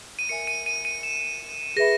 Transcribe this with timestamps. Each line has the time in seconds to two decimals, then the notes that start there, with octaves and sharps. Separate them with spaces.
0.19 D#7
0.29 A#4 E5 G#5 C#7
0.47 D#7
0.66 D#7
0.85 D#7
1.03 E7
1.76 G#4 B4 E5 B5 A#6